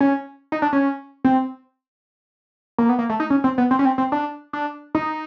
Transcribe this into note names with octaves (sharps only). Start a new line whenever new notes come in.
C#4
D#4
D4
C#4
C4
A#3
B3
A#3
A3
D#4
C#4
C4
B3
C4
C#4
C4
C4
D4
D4
D#4